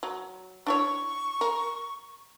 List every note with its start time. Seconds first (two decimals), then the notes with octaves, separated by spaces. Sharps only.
0.03 F#3
0.66 D4 E4 C#5 C#6
1.41 A#4